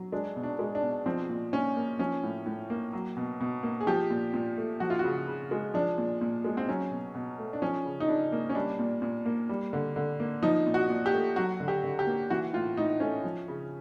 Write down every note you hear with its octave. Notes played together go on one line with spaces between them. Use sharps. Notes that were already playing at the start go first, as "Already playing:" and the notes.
Already playing: F#3
G#3 D4
B2
D4
G#3
D4
B2
F3 C4
A#2
A#2 C#4
A#3
F3 C#4
A2
A2
A#3
F#3
B2
B2
A#3
G#4
F3 G4
A#2
A#2
A3
F3 F#4
F4
C#3 F#4
C#3
G#3
F3 D4
A#2
A#2
G#3
C4
F#3 C#4
B2
B2
A3
D4
F3 C#4
C#3
D#4
C#3 D4
A#3
C#4
G3 D4
A#2
A#2
A#3
G3
D3
D3
A#3
F3 D#4
A#2
F#4
A#2
G4
A3
F#3 F#4
D3
G4
D3
G4
A#3
E3 F#4
A2 F4
A2 D#4
A3 C#4
F3
C#3